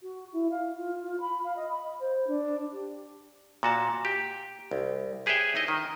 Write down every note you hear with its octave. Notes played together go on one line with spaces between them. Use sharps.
F#4
E4
F5
F4
F4
B5
F5
D#5
B5
C5
D4
G4
A#2 F#4 A5
G4
C2
G4 G#4 B4 C#5 E5 G5
D#4 E4 D#5
D#3